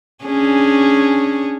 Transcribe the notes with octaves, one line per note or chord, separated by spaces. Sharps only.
C#4 D4 G#4